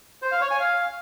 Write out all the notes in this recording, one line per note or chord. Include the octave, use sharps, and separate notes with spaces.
C5
F5
C#5
G#5
F5